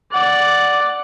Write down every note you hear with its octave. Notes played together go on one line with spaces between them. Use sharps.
D5 F#5